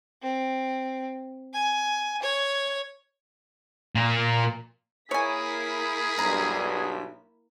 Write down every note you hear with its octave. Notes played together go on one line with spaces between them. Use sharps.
C4
G#5
C#5
A#2 A#3
A#3 E4 G#4 C#5 G#5 B6
B1 G2 A#5